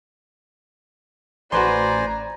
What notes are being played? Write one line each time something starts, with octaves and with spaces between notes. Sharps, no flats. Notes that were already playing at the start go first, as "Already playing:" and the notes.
A1 F#4 B4 C5 D5 G#5 A#5 C6